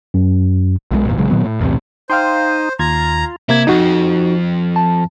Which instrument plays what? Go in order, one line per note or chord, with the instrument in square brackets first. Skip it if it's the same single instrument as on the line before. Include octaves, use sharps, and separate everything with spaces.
[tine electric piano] F#2
[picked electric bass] B1 B2 D#3 G#3
G#1 E2 A#2
A#1 C#3 F#3 G#3
A#2 D#3 F#3 B3
A2
B1 E2 A2 C3
[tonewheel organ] D#4 [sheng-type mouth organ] C5 [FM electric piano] F5 G5 C6
[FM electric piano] D#2 G#6 [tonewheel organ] F4 [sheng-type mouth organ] A#5
[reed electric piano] C3 A#3 G#6 [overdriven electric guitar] E4
[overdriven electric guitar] F2 [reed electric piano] D#4 F#4
[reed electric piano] A5